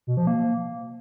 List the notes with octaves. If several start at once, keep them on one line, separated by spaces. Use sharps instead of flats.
B2
F3
A#3